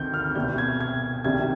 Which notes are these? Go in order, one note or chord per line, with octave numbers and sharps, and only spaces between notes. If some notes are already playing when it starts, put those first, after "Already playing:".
Already playing: D2 C3 D#3 G6
F6
C2 B2 G3 G6
G#6
G#6
C2 C3 D#3 G3 G#6